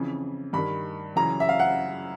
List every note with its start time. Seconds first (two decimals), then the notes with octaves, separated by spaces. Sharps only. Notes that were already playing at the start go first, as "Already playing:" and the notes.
Already playing: F2 C#3 E3
0.53 G2 D#3 B5
1.16 F#2 C#3 E3 A#5
1.40 E5
1.49 F5
1.59 F#5